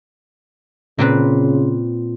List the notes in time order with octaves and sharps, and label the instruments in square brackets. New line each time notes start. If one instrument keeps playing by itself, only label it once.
[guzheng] A#2 C4 B4 [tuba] C#3